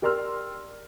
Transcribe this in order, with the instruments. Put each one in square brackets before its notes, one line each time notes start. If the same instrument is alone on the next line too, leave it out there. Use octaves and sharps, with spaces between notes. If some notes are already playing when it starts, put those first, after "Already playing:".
[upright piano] G4 A#4 D5 C6 E6 F6